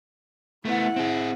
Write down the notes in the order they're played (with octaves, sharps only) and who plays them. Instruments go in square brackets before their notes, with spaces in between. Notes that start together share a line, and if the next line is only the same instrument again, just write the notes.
[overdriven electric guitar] A3 B3 [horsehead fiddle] E4 F#5
[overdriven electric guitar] C4 G#4